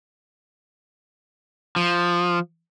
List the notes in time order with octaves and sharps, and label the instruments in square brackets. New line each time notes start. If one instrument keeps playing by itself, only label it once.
[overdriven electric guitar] F3